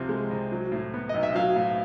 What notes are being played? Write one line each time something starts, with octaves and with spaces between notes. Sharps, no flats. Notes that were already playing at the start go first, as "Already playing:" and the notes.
Already playing: C2 C3 F3
G#3
C2
F#3
A2
B3
B1 D#5
E5
F#3 F5
A2